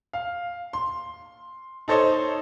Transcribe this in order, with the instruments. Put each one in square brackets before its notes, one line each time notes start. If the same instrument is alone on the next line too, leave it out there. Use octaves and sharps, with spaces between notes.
[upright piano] F5
C6
D#4 A4 C5 C#5 D#5